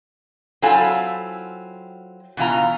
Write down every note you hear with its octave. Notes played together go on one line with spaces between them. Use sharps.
F#3 C4 E4 F4 A4 G#5
B2 E3 F4 A#5